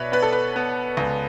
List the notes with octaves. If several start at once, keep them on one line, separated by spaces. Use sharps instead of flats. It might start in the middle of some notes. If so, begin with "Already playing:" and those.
Already playing: B2 B4 C#5 D5 E5
B3 B4
A4
B4
B3
C#2